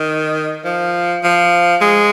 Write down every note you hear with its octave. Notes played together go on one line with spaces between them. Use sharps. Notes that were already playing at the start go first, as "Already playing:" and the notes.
Already playing: D#3
F3
F3
G#3